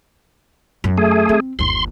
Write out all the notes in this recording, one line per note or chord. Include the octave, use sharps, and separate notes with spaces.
F#2
A3 G#4
C4
G1 D#2 C6